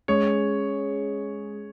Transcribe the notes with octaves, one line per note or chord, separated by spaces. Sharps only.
G#3 C#4 G#4 C#5